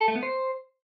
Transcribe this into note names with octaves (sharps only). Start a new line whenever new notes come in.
A4
A3
B3
C5